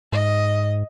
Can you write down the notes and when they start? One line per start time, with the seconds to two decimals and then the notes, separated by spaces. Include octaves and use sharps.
0.12 G#2 D#5